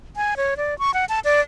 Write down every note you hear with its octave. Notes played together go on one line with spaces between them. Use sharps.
G#5
C#5
D5
C#6
F#5
A5
D5